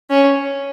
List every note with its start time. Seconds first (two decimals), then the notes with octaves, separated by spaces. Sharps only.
0.10 C#4